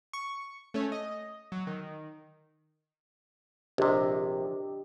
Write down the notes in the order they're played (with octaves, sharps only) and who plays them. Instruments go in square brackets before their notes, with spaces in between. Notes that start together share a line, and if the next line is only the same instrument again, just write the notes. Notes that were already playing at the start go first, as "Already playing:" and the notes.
[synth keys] C#6
A3 C#4 C#5
D#5
F#3
D#3
[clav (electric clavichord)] A#1 C3 [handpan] D4 G4 D#5